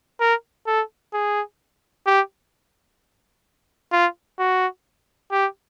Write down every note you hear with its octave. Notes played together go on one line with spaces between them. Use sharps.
A#4
A4
G#4
G4
F4
F#4
G4